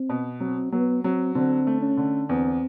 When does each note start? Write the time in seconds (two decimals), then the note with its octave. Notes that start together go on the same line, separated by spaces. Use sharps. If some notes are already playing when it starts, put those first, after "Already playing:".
Already playing: C4
0.09 B2
0.40 F#3 C4
0.72 F#3 B3
1.04 F#3 C4
1.35 D3 C4
1.67 A3
1.82 C#4
1.97 D3
2.29 E2 C4